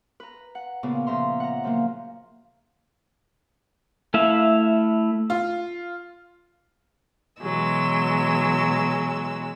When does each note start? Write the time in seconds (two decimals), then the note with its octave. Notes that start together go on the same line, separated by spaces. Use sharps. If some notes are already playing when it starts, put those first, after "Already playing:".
0.20 B4 A#5
0.55 F#5
0.83 A#2 C#3 B3
1.07 C#3 F3 E5 A#5 C6
1.40 F#5 A#5
1.64 C#3 F3 F#3 A#3
4.14 A3 E4 E5 F5
5.30 F4
7.41 B2 E3 F#3 G#3 E6